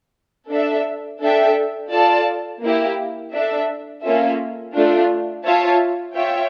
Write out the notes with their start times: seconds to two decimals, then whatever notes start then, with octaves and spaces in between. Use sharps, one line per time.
0.51 D4 A4 E5
1.22 D4 A4 E5 G5
1.91 F4 A4 D5 A5
2.62 A#3 E4 G4
3.32 D4 A4 E5
4.03 A#3 C#4 F4 A4 E5
4.74 A3 D4 F4
5.44 F4 C#5 E5 A5
6.15 F4 C#5 E5 G5